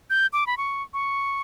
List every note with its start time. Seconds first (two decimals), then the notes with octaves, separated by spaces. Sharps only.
0.10 G6
0.33 D6
0.47 B5
0.57 C#6
0.94 C#6